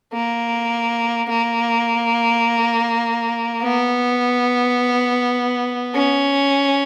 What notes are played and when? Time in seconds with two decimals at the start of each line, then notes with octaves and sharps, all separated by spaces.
0.14 A#3
1.30 A#3
3.62 B3
5.95 C#4